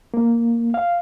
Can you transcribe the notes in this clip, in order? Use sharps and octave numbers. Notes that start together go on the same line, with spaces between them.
A#3
F5